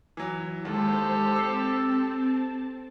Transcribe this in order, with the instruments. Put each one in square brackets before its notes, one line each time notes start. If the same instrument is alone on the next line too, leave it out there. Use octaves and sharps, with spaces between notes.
[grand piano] E3 F#3
[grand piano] D#2 [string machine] G#3 C5 [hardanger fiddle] G4 A4
[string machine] C4 A5 [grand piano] E6 C7